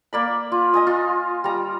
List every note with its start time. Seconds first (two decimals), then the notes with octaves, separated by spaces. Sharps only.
0.13 A#3 D5 B5
0.52 F4
0.74 D#5 G#5 D#6
0.87 F4
1.44 G3 A#5